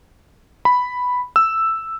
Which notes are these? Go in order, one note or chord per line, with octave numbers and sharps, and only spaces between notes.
B5
E6